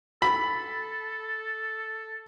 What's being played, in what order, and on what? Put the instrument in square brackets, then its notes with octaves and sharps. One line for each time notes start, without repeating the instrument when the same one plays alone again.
[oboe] A4 [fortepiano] B5